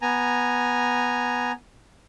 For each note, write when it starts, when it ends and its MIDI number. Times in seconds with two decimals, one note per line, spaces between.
0.02 1.52 59
0.02 1.52 80
0.02 1.52 82